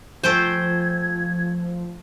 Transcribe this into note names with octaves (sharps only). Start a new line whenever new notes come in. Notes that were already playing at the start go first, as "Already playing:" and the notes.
F3 A3 C5 G5 G#5 G#6